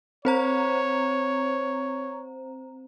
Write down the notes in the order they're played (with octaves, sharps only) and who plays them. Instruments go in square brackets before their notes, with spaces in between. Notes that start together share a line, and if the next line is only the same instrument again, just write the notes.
[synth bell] C4 C5 A#5 [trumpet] C#5